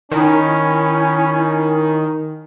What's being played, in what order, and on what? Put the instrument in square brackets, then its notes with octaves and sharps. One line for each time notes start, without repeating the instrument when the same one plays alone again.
[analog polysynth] D#3 [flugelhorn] C#4 [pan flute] E4